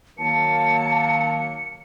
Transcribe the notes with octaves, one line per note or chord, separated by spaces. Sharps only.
D#3 F#3 A#3 A5 C#7